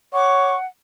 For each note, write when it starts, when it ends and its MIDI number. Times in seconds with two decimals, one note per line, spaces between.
0.13 0.56 73
0.13 0.66 78
0.13 0.56 85
0.13 0.56 86